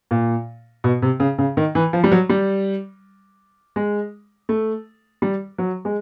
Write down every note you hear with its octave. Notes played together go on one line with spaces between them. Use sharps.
A#2
B2
C3
C#3
C#3
D#3
E3
F3
G3
F#3
G3
G#3
A3
G3
F#3
G#3